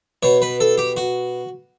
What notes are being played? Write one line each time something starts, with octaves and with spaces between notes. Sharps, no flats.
B2 C#5
B4
A4
G4
F#4